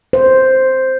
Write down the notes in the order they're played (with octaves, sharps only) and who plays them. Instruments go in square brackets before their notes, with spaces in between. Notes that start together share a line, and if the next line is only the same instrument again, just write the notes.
[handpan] C5